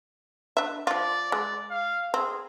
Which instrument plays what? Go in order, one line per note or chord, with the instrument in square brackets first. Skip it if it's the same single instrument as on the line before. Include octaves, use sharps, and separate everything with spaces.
[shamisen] D4 E5
[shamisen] F3 F4 [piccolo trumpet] D5
[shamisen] G#3 [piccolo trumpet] D5
[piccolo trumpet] F5
[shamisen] C4 [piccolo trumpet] G#4